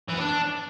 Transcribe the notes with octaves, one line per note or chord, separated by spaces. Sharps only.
E3
B3
D4